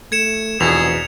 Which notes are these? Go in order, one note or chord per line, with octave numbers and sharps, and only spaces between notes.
A3 G#6 C#7 E7
F1 E2 B2 G#4 F7